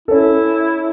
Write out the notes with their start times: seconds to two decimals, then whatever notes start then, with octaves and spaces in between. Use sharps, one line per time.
0.08 C#4 E4 A4